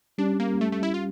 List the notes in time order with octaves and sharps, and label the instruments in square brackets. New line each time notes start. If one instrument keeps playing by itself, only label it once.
[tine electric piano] G3 C#4 G4 [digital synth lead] D4
[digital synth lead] A#3
A3
A3
E4
F4